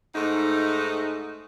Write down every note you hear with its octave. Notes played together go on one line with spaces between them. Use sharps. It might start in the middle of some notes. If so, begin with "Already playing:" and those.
G#2 A3 D#4